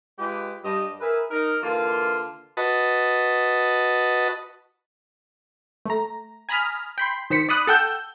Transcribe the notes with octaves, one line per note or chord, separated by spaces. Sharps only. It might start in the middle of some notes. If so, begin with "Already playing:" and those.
G#3 F4 G4 B4
G2 G3 D#5
G#4 A#4 B4 E5
D#4 A#4
D3 E3 A#3 F4
F#4 B4 D#5 A5
A3 A#5
G#5 A#5 B5 D#6 F6
G5 B5 C6
D#3 C5 B6 C#7
D5 B5 D#6 F#6
A4 F#5 G5 E6 G6